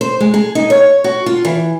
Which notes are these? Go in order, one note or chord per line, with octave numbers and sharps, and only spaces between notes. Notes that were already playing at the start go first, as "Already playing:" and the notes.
C5
G#3
G#4
D#4
C#5
F#4
F4
E3